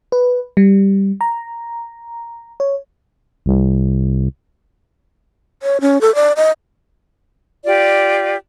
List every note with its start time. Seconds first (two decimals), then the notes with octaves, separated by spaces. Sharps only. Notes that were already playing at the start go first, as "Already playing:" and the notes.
0.12 B4
0.57 G3
1.21 A#5
2.60 C#5
3.46 C2
5.63 C#5
5.81 C#4
6.01 A4
6.15 D5
6.36 D#5
7.65 F4 G4 D5